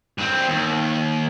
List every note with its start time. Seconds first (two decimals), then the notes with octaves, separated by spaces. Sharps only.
0.18 G2 C4
0.49 D#2